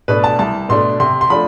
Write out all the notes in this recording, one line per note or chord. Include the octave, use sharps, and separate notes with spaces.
B2 A3 D4 B4
A5
C2 A5
B2 A3 D4 C6
C3 C6
C6
F3 A3 D4 B5